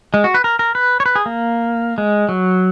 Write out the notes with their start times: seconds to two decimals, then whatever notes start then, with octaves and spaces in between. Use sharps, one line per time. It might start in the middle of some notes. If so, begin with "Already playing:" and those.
0.14 G#3
0.24 F#4
0.34 B4
0.44 A#4
0.59 A#4
0.75 B4
1.00 C#5
1.06 B4
1.15 G#4
1.26 A#3
1.98 G#3
2.29 F#3